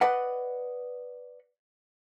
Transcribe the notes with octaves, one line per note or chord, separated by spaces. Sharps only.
B4 D5 D#5 F#5